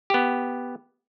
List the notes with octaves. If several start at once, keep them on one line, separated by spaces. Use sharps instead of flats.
B3 G4